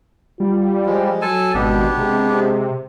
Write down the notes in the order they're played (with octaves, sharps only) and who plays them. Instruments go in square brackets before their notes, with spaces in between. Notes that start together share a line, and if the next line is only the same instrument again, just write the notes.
[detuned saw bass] G3 [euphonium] F4
[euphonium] F3 [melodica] G#3
[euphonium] F#3 [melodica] A4 G#5 A5
[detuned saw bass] G#1 [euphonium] B2 [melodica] B3 D4 G4
[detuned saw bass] C3 [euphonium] G#3